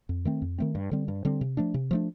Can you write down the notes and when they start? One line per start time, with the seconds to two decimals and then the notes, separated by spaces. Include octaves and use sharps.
0.09 F2
0.25 D#3 A3 C4
0.42 F2
0.58 D#3 A3 C4
0.75 G2
0.91 D3 G3 C4
1.08 G2
1.25 D3 G3 C4
1.41 C3
1.57 F3 A3 D4
1.74 C3
1.91 F3 A3 D4